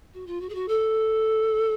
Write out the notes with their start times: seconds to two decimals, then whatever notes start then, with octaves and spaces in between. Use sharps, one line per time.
0.14 F#4
0.27 F4
0.41 F#4
0.49 G#4
0.55 F#4
0.68 A4